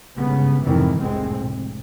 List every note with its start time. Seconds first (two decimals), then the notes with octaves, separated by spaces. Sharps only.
0.18 G1 G#2 C#3 B3
0.65 F2 G#2 C3 D#3 E3
0.99 F1 C#2 A2 G#3 C4
1.38 F1